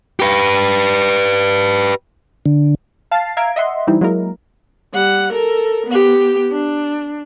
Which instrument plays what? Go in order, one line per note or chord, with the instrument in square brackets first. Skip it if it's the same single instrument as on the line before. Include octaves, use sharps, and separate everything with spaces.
[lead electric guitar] G4 B4
[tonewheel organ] D3
[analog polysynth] F5 A5 F6 A6 C7
E5 F5 A#5 G#6 D7
D#5 E5 F#5 C6
E3 G3 C4 D#4 E4
F#3 G#3 A#3 E4 A#4
[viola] G3 F#5
A4 A#4
B3 G4
D4